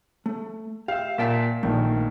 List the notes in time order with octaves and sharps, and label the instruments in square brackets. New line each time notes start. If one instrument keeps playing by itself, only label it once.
[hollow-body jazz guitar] A3
[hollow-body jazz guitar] G4 E5 [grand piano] F5
[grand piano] A#2 B6 [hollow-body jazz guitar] E5 G5 A5
[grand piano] A#1 D#3 A#3 [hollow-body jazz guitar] A3